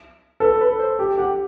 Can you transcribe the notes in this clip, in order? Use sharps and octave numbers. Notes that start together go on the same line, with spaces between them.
A4 B4
B4
C5
G4
G4 F#5